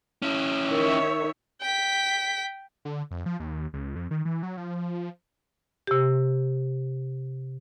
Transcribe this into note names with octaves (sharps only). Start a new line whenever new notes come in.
C#4 E4
D#3 C#5 E5
G5 B6
D3
F2
F3
D#2
C#2
F2
D#3
E3
F#3
F3
C3 G4